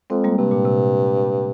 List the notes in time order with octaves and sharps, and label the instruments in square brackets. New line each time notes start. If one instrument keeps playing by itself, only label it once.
[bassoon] F2 [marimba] G#3 C4
[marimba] G3 A#3
[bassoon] G2 [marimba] C3
[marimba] A#2
C3